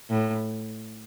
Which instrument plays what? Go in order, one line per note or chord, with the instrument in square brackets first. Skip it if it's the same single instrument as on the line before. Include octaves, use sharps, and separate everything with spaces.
[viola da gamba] A2